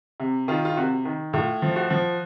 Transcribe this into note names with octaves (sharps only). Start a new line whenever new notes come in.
C3
D#3 F4
F4
C3 F#4
D#3
A2 F4
F3
F#4
F3